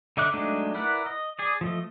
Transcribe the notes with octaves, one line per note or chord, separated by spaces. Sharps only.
D3 D#4 E5 D6 F#6
F#3 G#3 A3 D4 D#4
E4 A#4 B4 D5 F#5
D#5
G#4 D5
F3 A3 D#5